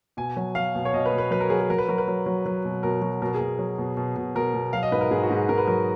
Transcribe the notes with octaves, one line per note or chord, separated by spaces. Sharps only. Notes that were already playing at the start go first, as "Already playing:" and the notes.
B2 G#5
F#3
F#3 F5
B2
C#5
B2 D#5
B4
B2
B4
F#3 B4
A#4
F#3 G#4
G#4
F#3 A#4
B4
F#3 A#4
B4
F#3
F#3
F#3
B2
B2 A#4
F#3
B2 A#4
G#4
B2
F#3
B2
B2
B2
B2 A#4
B2
F#3 F5
D#5
G#2 B4
A#4
G#2 G#4
F#4
G#2
G#4
G#2 A#4
B4
F#3 A#4